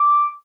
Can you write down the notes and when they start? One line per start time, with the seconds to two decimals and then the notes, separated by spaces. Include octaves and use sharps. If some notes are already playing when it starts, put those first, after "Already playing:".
Already playing: D6